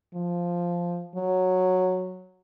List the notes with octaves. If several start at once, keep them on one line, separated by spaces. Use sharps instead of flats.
F3
F#3